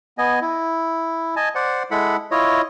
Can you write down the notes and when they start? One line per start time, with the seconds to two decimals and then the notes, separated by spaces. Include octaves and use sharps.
0.18 B3 D#5 G#5
0.41 E4
1.36 D#5 G#5 A5
1.55 C5 D5 F#5
1.91 G#3 E4 A4 F#5 B5
2.31 E4 F4 C#5 D#5